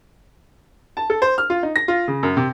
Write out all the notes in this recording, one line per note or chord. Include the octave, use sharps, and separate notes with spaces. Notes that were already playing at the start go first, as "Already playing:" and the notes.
A5
A4
C5
F6
F4
D#4
A#6
F4
C#3
F#2
C3